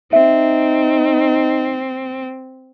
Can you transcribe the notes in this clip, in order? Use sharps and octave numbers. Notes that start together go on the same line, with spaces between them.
C4 D#4 E5